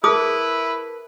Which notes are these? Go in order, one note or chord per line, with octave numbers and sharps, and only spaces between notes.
E4 G#4 A#4 B4 A5 D#6